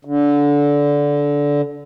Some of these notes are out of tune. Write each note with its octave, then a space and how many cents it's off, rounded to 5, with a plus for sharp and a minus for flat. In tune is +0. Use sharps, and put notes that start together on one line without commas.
D3 -20